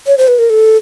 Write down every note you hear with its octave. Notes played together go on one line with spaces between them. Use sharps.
C#5
C5
B4
A#4
A4